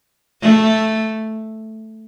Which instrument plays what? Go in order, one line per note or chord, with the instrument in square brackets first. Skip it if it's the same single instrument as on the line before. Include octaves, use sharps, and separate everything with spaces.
[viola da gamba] A3